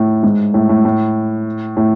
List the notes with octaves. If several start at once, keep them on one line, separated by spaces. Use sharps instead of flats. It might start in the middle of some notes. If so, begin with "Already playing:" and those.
Already playing: A2
G#2
A2
A2
A2
A2